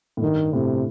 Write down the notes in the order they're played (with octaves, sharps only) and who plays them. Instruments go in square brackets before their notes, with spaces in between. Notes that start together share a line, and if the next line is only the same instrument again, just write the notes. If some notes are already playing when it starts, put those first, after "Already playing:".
[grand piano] A2
[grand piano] G2 [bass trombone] D#3
[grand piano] A2 [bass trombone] C3